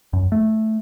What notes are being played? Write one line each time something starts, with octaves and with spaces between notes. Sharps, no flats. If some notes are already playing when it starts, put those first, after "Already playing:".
F#2
A3